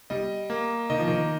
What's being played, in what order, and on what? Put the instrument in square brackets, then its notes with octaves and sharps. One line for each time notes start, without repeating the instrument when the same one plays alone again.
[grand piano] G3 [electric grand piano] D#5
[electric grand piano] A#3
[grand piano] D#3 [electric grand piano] D#5
[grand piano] F3
D#3